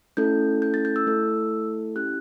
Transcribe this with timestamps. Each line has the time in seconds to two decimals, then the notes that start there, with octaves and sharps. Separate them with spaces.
0.17 A3 C#4 E4 A4 G6
0.62 G6
0.74 A6
0.85 G6
0.96 E6
1.07 A3 E4 A4
1.95 C#4 E4 G4 F#6